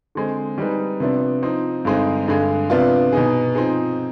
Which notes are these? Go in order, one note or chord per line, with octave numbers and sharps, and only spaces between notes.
D3 G#3 C4
G3 C4 D#4 G#4 B4
C3 F3 B3 D4
F3 C4 D#4
G2 D3 G#3 C4 D#4
G2 D3 G#3
C3 F3 B3 D4 F4
B2 B3 D#4 G#4
F3 C4 D#4 G#4